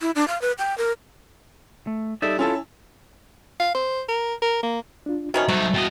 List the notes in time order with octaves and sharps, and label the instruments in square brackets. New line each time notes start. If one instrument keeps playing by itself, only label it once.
[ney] E4
D4
F5
B4
G5
A#4
[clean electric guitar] A3
[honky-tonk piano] G3 A4 [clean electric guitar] D#4 D5 E5
[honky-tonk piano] C#4 E4 A5 [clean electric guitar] F4 A4
[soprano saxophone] F5
C5
A#4
A#4
A#3
[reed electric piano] D4 F4
[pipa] D#3 F3 C#4 [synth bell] F#4 D#5 G#5 [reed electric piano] E5 A#5
[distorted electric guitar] F#3 D#4 [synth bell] G3 [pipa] A3
[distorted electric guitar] E2 D#5 [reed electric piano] F#4 [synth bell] E5 G5 A5